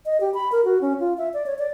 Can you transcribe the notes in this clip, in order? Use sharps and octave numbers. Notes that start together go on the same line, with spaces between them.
D#5
G4
B5
A#4
F#4
C#4
F4
E5
D5
C#5
D5